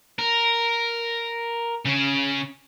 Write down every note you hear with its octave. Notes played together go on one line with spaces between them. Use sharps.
A#4
C#3 C#4